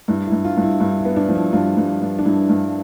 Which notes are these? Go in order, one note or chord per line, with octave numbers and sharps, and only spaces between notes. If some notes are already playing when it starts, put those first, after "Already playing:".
G2 E4
E4
G2
F4
G2
E4
G2 E4
E4
B3
D4
F3
E4
G2 F4
G2
G2
D4
G2 E4
G2